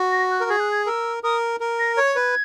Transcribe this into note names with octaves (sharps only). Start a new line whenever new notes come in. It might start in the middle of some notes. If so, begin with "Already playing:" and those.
Already playing: F#4
A#6
F#6
A#4
G#4 G#6
F#6
G#6
A#4 E6
A#4 D#6
A#4
A#6
C#5 G#6
B4